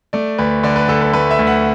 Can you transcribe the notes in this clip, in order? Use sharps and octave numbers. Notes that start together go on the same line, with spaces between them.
A3 D5
D2 B4
D3 D5
B4
D2 A4
B4
A3 B4
E5
D2
F#5